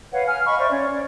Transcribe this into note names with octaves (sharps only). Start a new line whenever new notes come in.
B4 C#5 F5 F#5
G#5 F6
D#5 F5 B5 C#6
C5 D5 E5
C#4 C#5 D5
D5